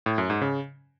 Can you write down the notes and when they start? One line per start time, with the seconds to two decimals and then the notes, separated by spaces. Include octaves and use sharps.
0.06 A2
0.18 F#2
0.30 G#2
0.41 C#3